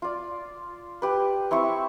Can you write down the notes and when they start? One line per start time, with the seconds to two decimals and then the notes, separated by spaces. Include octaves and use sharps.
0.02 F4 D5
1.02 G4 B4
1.51 C4 E4 E5 C#6